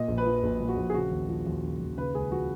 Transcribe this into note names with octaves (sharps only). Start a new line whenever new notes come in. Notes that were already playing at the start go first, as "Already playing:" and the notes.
Already playing: A#2 D#5
A#1
B4
F3
A#1
A#2
F#4
A#1
G#4
C#3 F#4
D#2
F3
D#2
C#3
D#2
C#3 B4
C#2 G#4
F3 F#4